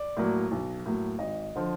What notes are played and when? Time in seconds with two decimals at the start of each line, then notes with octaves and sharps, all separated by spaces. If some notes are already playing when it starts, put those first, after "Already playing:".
Already playing: D5
0.17 A2 F#3 A#3
0.51 B1
0.86 A2 F#3 A#3
1.19 G#1 D#5
1.56 D3 F3